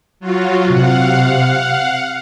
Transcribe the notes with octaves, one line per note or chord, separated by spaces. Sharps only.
F#3 F4 F#4
C3 F5 F#5